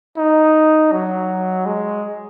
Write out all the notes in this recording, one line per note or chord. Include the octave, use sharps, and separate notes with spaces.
D#4
F#3
G#3